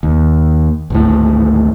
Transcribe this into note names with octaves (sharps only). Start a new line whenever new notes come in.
D#2
G#1 D2 A2